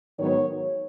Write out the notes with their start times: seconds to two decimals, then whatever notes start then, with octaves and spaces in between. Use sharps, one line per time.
0.19 G#2 D#3 F#3 B3 C#5